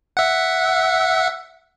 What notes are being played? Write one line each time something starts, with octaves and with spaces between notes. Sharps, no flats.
E5 F#5